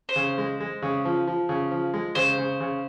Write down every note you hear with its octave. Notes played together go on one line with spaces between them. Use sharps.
C5
C#3
G#3
G#3
C#3
F3
F3
C#3
F3
G#3
C#3 C5
C#3
C#3